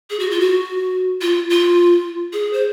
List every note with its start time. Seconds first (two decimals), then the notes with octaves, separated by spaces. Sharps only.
0.10 G#4
0.19 F#4
0.31 F4
0.40 F#4
1.21 F4
1.50 F4
2.33 G#4
2.53 C5